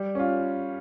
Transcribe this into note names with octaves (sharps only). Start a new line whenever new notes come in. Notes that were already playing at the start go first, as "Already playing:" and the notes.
Already playing: G3
C#4 F4